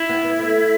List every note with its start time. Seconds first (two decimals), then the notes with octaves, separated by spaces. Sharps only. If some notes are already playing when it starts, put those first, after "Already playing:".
Already playing: E4
0.09 B3
0.24 B3
0.39 A3